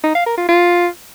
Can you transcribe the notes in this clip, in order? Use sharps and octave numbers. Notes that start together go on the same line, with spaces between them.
D#4
F5
A#4
F4
F4